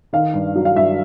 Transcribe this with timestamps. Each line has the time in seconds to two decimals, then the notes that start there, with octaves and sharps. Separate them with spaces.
0.13 D#3 F5
0.34 G2
0.56 F#3
0.65 F5
0.76 G2 E5